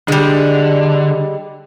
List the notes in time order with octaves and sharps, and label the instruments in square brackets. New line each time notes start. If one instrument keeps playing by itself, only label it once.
[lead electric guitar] D3 [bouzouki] G3 G#3